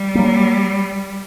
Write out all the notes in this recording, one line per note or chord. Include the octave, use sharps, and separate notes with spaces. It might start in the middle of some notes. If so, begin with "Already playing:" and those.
Already playing: G3
F#3 A#3